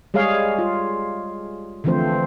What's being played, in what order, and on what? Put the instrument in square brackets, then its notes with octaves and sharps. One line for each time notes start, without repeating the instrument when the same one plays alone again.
[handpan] G3 G#3 G#4 C#5 F5
F4
D3 E3 F3 A3 C4 C5